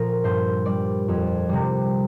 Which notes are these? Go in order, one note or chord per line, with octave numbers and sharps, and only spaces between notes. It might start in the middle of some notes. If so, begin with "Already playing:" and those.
Already playing: A#2 F3 A#4
G2 C5
G3 D5
F2
C3 G3